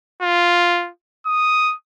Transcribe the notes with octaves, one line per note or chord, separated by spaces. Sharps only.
F4
D#6